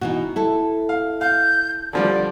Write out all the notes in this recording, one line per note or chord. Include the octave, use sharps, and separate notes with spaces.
B2 E3 D#4 F#4
E4 A4
F5
F5 G6
D3 F3 G3 D5